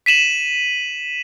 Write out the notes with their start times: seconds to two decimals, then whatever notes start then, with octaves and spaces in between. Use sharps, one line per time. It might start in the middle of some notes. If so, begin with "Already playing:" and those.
0.06 B6 D#7 E7 F#7